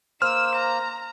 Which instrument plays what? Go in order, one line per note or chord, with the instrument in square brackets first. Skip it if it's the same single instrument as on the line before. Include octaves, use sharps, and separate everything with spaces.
[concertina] A#3 [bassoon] C5 [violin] E6 E7 [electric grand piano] F6
[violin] A#5